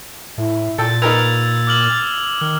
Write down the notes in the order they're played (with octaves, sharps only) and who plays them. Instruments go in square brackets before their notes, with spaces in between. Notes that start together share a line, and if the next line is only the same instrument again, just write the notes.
[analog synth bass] A2 [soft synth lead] E4
[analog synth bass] A#2 [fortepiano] A4 G5 [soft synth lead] A6
[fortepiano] D#4 A#4 B4 [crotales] E6 G#6 F7
[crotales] D6 F6 F#7
[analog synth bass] D#3 [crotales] F6